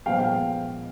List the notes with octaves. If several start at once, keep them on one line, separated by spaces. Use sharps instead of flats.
A#2 F3 G#3 B3 F5 G5
F5 G5